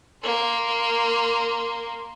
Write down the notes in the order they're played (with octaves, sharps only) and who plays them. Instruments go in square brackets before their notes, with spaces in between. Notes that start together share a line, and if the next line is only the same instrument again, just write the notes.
[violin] A#3 C6